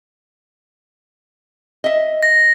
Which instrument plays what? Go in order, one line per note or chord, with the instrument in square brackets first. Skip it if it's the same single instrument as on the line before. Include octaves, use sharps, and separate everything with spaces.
[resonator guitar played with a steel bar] D#5 E5
[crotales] A#6